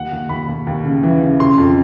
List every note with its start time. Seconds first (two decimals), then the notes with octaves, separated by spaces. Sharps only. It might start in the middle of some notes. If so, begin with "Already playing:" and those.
Already playing: D#2 F#5
0.12 D#2
0.29 D#2 B5
0.48 D#2
0.67 D#2
0.84 C#3
1.03 E3
1.22 C#3
1.40 C#3 C6
1.58 F2